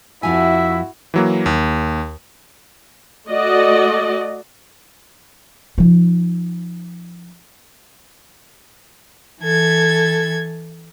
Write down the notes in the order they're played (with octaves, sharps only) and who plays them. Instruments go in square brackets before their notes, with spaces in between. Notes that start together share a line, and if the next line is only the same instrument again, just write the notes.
[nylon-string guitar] F2 F3 G#5 [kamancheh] E4 F#4 [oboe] E5
[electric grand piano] E3 F#3 A#3
D#2
[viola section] A3 F#4 D5 D#5
[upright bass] F3 D#4
[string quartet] E3 A4 G#6